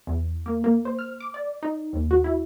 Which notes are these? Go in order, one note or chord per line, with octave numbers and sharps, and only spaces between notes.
E2
A#3
A#3
C5
F6
D6
D5
D#4
D#2
F#4
E4